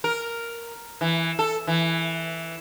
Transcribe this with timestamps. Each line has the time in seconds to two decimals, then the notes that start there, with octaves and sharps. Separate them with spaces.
0.04 A#4
1.01 E3
1.39 A4
1.67 E3